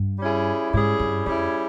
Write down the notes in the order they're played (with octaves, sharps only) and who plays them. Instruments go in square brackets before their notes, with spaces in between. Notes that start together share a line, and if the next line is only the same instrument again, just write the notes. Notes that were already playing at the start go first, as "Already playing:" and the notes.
Already playing: [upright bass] G2
[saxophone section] G3 C#4 E4 G#4
[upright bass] G#2 [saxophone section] G3 C#4 E4 G#4
[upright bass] G2
[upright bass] F2 [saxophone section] G3 C#4 E4 G#4